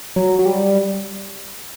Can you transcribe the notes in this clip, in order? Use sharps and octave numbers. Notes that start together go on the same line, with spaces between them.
F#3
F#3
G3